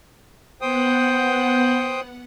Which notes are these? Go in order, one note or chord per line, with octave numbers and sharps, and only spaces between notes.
B3 C5 F#5 G5 D#6